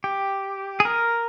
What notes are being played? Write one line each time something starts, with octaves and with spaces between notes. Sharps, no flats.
G4
G#4
A#4